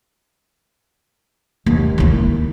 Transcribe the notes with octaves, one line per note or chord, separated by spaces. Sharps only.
D#2
D#3 E4